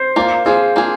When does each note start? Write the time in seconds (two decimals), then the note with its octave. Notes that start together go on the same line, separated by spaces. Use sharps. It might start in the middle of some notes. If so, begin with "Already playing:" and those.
Already playing: C5
0.16 A#3 F4 A#4 D5
0.46 F3 A#3 F4 G#4
0.76 A#3 D4 F4 G#4